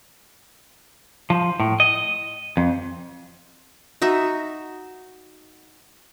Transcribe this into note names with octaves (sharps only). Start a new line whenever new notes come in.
F3
A2
D#5
F2
D#4 F#4 E5